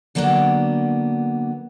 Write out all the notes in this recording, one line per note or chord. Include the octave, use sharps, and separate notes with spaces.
D3 F#3 A#3 B3 D4